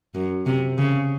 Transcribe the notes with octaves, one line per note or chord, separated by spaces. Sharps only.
F#2
C3
C#3